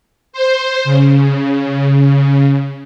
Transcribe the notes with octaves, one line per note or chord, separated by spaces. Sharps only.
C5
C#3